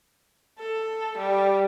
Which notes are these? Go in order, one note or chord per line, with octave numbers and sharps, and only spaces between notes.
A4
G3